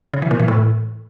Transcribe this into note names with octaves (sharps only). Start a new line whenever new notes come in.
C#3
E3
A#2
E3
A2